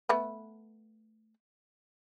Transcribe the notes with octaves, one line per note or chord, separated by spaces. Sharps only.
A3 B3 B4